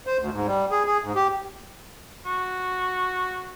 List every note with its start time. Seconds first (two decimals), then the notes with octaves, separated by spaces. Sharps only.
0.07 C5
0.19 D2
0.31 G#2
0.47 G3
0.71 G#4
0.86 G#4
1.04 G#2
1.16 G4
2.26 F#4